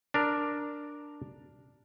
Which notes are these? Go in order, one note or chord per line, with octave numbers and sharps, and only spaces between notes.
D4 A#4